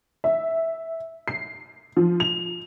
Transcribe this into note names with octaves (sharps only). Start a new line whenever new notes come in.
E5
C7
F3
F7